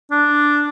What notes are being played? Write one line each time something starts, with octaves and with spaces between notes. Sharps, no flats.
D4